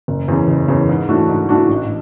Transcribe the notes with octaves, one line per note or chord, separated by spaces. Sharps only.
F#1
E2 C#3
F#1
E2 C#3
G#2
E3 A3 D4 F#4
G#2
E3 A3 D4 F#4
A1